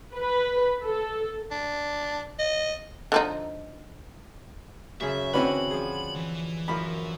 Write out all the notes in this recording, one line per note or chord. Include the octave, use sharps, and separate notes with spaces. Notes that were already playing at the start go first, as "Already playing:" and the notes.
B4
A4
D4
D#5
D3 F3 D#4
F#2 C#3 G#4 E5
D3 E3 C4 C#4 F#4 B4 B5
F3 G#4
E3
F#2 F3 A#4 B5